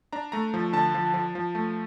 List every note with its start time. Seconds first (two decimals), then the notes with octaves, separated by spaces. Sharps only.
0.13 D4 A#5
0.32 A3 A#5
0.54 F3
0.73 D3 A5
0.94 F3
1.14 F3
1.35 F3
1.55 A3